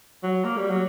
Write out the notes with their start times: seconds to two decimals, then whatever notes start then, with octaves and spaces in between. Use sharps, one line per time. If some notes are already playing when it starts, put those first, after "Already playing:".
0.23 F#3
0.44 A#3
0.57 G3
0.69 F#3